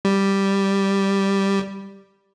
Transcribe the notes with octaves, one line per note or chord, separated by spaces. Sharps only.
G3